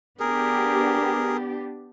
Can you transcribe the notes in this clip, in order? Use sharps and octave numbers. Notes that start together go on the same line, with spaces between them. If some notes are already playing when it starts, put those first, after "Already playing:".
B3 D4 G4 G#4 A#4